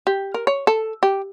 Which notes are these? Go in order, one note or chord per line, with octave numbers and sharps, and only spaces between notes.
G4
A#4
C#5
A4
G4